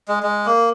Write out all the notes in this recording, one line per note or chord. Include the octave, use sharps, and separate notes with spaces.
G#3
G#3
A#3